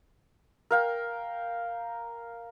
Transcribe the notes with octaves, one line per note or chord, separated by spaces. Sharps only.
A#4 F5 G5